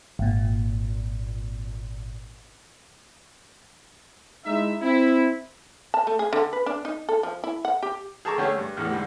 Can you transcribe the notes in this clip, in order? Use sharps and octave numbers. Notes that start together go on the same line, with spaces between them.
G#1 A#2
G#3 D#4 E4 E5
C4 E4
A5
A3
G#4
D3
B4
D4
D#4
A4
F3
E4
F#5
G4
G#4 A4 A5 A#5 C#6 D6
D3 A3 C#4 G4 G#4
G2
E2 A2 F6
G#2 D3 G3